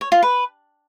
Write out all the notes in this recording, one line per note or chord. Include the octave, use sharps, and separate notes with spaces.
C#5
F4
B4